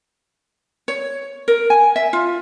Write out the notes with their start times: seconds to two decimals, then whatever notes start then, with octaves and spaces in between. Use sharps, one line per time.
0.88 C#5
1.48 A#4
1.70 G#5
1.96 E5
2.13 F4